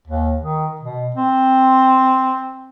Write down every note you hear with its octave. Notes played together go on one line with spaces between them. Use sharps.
D#2
D#3
B2
C4